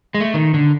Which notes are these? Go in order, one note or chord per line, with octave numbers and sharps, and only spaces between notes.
G#3
A3
D#3
D3